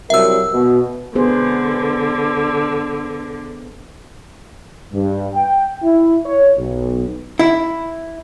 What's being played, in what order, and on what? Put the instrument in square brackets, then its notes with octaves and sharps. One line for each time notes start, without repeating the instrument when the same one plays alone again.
[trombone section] C2 F#3 A#4 [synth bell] E5 E6
[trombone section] B2
[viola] D3 [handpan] B3 G#4 C5
[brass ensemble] G2
G5
E4
C#5
B1
[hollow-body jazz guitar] E4